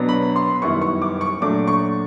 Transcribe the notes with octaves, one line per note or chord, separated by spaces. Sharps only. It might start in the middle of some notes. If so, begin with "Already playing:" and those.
Already playing: B2 F#3 B3 D4
B5
C6
F#2 D#3 G3 B3 E4 C#6
C#6
D6
C#6
A#2 F#3 A3 D4 D6
C#6